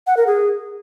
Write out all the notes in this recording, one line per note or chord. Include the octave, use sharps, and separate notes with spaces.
F#5
A#4
G#4